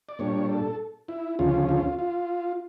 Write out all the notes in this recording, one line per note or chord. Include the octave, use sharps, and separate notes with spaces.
D5
A#2 G3 D4 C#5
A4
E4
D2 C#3 F3 C#4 F4
F4
F4